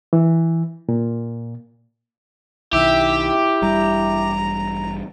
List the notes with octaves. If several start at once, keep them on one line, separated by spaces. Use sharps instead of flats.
E3
A#2
B1 D#3 E4 G4 E5
A1 G2 G3 A#5